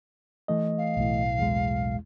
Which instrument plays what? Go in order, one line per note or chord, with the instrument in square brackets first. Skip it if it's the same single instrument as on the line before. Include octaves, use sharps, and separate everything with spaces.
[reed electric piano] E3 A3 D#5
[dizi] F5
[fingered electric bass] B1 A2
[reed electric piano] E2 G#3